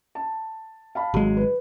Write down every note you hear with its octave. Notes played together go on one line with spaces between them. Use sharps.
A5
F5 A5 B5
G#1 F#3 G#3
B4